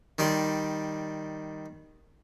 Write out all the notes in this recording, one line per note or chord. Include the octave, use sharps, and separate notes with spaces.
D#3 G3 D5 C6